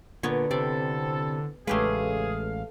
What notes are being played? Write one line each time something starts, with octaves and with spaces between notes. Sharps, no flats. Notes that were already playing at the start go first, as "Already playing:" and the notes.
A#2 D3 B3 B4 C#5
C3 C4 E4 A4 D5
A1 C#3 G#3 A3 G4 G#4 B4 F5